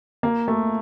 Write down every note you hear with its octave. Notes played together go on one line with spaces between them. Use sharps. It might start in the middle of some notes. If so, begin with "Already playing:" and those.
A#3
A3